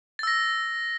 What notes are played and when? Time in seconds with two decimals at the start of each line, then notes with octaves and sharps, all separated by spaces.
0.19 A6
0.23 E6
0.27 A#6